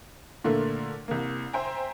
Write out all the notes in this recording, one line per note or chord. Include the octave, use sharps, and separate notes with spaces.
A#2 D3 A3 A#3
C2 A#3
C5 E5 G5 G#5 A#5